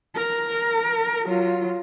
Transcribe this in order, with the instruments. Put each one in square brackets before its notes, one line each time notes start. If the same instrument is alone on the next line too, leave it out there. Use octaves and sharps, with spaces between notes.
[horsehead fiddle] A#4
F#3 F4